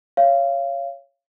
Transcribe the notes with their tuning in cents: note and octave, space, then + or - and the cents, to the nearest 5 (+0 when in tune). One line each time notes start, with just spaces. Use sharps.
C#5 +0 F5 -25